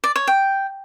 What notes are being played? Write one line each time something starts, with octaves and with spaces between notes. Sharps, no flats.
D5
C#5
G5